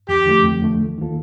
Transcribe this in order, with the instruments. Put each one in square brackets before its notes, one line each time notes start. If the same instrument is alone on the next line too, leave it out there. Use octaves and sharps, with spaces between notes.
[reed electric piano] F2 [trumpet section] G4
[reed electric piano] D3 F3 A3
F2
D3 F3 A3
D#2
D#3 A#3 F4 A4